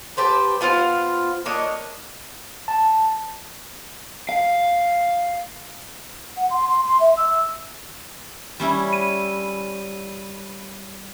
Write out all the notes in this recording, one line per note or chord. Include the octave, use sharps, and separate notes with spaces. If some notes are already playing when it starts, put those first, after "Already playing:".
G4 B4 C5 A5
B3 F4 C5 F5
A#3 D4 C#5 D#5
A5
F5
F#5
C6
C6
C6
E5
E6
G3 C#4 E4
D#7